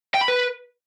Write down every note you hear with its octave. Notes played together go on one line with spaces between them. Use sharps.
G5
B5
B4